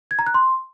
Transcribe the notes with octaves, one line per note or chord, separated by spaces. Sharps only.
G#6
A#5
F#6
C6